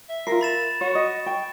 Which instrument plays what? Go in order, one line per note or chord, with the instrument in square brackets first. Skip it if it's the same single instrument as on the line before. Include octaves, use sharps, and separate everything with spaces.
[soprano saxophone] E5
[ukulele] F4 A#4 [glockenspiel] C7
[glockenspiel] B5 A6 E7
[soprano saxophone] F#4 [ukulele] C#5
[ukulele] D#5
[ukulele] G5 [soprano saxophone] C#6